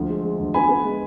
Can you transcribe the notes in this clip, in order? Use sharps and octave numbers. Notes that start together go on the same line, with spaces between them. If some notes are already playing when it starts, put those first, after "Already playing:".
Already playing: D2 F3
G#3
G#3
D2
B3 G#5 B5
B3
G#3